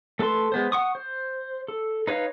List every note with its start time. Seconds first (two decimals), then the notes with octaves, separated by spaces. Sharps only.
0.19 A3 A4 B4 A5 C6
0.52 G#3 B3 C5
0.72 F#5 C#6 D#6
0.95 C5
1.68 A4
2.07 D#4 B4 C#5 F5